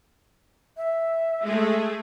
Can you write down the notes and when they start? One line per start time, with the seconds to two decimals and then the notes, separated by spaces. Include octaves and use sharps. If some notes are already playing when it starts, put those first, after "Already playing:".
0.77 E5
1.44 G#3 A3 G#4